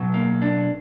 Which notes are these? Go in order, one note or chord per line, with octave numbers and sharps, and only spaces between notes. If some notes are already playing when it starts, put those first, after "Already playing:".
Already playing: B2 F#3
A#3
D4